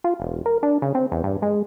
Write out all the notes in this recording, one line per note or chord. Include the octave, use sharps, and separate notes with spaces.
F4
E1
A#4
D4
C#3
C4
E2
G2
G#3